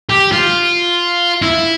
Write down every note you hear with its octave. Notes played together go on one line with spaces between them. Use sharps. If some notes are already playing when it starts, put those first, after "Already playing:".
G4
F4
E4